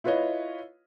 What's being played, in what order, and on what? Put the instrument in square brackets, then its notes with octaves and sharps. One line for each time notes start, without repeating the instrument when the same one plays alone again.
[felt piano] E4 F4 B4 C#5 D#5